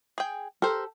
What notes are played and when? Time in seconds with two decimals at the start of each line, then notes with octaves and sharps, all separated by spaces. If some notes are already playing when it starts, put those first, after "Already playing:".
0.18 G#4 G5
0.62 G4 A4 A#4 C5